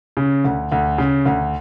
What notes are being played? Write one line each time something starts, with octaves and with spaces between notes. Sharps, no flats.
C#3
D2
D2
C#3
D2